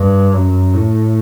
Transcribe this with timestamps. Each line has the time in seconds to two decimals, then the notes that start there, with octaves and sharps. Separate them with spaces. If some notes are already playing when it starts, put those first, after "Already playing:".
Already playing: G2
0.33 F#2
0.74 A2